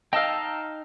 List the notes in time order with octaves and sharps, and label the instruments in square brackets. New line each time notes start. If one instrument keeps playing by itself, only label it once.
[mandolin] D#4 F5 [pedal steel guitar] G5 A5 E6